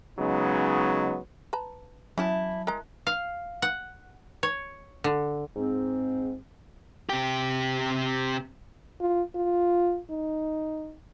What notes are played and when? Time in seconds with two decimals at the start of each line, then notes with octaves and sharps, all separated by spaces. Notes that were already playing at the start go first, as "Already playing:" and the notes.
0.18 C#3 F#3 G#3 B3 D#4
1.53 B4 A5 A#5
2.18 E2 F#3 C#4 E4 F#5 A5
2.67 G#3 A#4 A#5
3.07 F5
3.62 F#5
4.43 C#5
5.04 D3
5.56 G#2 C4
7.09 C3 G4
9.01 F4
9.35 F4
10.10 D#4